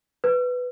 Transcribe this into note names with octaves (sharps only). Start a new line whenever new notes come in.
B4